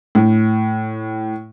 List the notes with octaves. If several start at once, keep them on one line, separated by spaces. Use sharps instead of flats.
A2